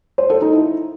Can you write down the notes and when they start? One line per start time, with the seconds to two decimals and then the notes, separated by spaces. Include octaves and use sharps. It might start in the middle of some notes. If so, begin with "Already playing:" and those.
0.18 C5
0.30 A4
0.42 D#4
0.53 E4